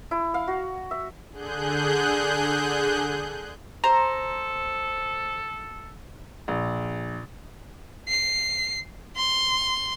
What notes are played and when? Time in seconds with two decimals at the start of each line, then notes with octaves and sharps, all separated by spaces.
0.11 E4
0.34 F5
0.48 F#4
0.91 E5
1.32 D3 G#4 F#6 G6
3.84 A4 C5 A#5
6.48 A#1
8.09 C7
9.17 C6